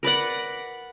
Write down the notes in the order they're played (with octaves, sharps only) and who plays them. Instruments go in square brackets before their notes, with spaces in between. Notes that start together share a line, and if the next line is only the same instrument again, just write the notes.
[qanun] A#4 B4 D5 F#5